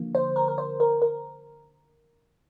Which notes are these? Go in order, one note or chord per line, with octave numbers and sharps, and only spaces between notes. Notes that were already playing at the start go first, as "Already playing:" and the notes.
Already playing: D3 F3 A#3
C5
A#4
A#4
C5
A#4
A#4